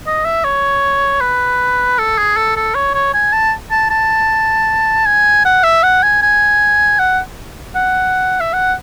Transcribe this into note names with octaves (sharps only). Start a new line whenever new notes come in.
D#5
E5
C#5
B4
A4
G#4
A4
A4
C#5
C#5
G#5
A5
A5
A5
G#5
F#5
E5
F#5
G#5
G#5
F#5
F#5
E5
F#5